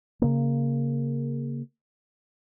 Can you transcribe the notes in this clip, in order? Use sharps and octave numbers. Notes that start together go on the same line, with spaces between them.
C#3 A#3